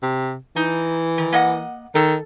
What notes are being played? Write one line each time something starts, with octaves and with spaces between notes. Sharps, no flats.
C3
E3 D#4
D#3
A#3 D#5 F#5
D#3 A4